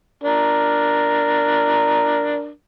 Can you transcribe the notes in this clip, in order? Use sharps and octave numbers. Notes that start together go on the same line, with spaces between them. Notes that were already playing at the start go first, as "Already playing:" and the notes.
D4 A#4